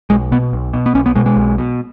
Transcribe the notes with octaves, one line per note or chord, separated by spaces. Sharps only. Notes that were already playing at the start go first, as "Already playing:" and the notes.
B1 G#3
B2 B3
B1
B2
B3
B1 C#4
B3
B2 G#3
G#3
B1
B2